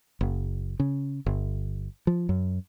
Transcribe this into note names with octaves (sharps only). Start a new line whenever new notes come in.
F#1
C#3
G1
F3
F#2